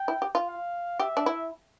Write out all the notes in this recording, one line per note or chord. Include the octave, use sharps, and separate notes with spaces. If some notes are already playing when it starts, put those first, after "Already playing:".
Already playing: G5
E4
G4
F4
F5
G4 E5
D4
E4